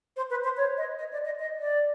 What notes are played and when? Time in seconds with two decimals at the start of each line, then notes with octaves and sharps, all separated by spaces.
0.16 C5
0.30 B4
0.44 C5
0.57 C#5
0.77 D#5
0.98 D#5
1.12 D5
1.25 D#5
1.39 D#5
1.59 D5